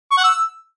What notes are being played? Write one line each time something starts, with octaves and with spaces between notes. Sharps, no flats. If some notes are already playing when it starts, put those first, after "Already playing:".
C#6
F#5
E6